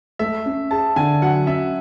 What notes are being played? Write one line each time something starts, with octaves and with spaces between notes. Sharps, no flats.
A3 E5
C#4
G#4 A5
D3 G#5
F#3 F#5
C#4 E5